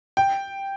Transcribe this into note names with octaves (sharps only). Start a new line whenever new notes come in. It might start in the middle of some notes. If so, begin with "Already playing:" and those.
G5